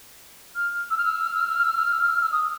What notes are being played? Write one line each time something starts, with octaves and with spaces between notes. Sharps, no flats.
F6
E6
F6
E6
F6
E6
F6
E6
F6
E6
F6
E6
F6
E6
F6
E6
F6
E6
F6
E6
D#6